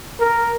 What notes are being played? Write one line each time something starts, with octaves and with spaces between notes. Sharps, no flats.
A#4